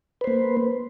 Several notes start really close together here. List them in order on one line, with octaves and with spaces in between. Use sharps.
B4 C5 A#3